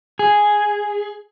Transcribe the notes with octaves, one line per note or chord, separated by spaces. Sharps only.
G#4